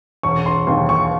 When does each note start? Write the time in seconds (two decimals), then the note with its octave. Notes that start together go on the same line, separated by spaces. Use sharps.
0.23 E1 C#6
0.46 C6
0.67 D#2 D#3 C6
0.89 C#6